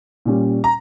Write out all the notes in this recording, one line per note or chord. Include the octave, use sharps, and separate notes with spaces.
A#2 G3 C#4
A#5